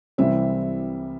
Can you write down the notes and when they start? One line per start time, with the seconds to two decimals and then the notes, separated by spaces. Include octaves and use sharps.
0.18 C2 C3 E3 G3 C4 E5